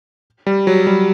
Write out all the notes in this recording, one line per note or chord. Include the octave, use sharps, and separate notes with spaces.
G3
F#3
G3